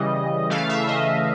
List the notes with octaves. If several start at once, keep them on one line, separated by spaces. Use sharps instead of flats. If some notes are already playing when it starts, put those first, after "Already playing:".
Already playing: C#3 E3 G3 D#5
C#3 E3 A3 F5
E5
D#5